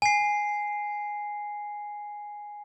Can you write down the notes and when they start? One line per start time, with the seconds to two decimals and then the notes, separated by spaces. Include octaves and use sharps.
0.02 G#5 C7